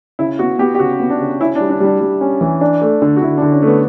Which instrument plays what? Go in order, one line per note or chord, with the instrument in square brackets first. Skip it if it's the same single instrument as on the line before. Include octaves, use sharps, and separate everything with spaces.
[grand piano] C#3 [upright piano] E4
[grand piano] B3 [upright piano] F#4
[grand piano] B3 [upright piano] G4
[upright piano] G4
[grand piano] C#3 [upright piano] F#4
[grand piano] B3
[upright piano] D4
[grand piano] C#3
[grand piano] C#4 [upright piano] E4
[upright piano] D4
[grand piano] G3
[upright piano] D4
[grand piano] G3 [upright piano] D4
[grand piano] G3
C#4
E3
D4
A3
D3
[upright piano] F#4
[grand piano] D3 [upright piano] E4
[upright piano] D4
[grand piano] D3
[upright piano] C#4
[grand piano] A3
[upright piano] B3